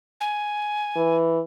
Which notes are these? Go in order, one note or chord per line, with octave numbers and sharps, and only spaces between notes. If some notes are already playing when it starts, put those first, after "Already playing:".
G#5
E3